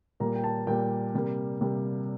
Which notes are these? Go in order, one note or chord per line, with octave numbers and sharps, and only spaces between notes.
A#2 G3 A#3 A#5
G5
A5
A#2 G3 A#3 G5
C3 G3 A#3
C3 G3 A#3